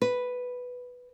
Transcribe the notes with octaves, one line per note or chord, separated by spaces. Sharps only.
B4